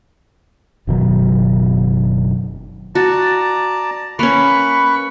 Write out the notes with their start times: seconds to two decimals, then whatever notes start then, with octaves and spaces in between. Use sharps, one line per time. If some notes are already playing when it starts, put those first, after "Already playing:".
0.87 F#1 B2 D#3 F#3
2.95 F#4 D5 A5 A#5
4.19 A#3 C#4 B4 B5 C#6